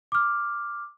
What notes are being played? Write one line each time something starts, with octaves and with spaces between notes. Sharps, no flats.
D6 F6